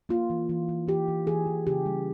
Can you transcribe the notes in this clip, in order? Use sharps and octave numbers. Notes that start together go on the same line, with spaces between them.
A#3 F4
E3
E3
E3
E3 G4
E3
E3 G#4
E3
C#3 G4
G3